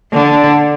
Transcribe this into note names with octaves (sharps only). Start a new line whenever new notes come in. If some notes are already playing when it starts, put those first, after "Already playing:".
D3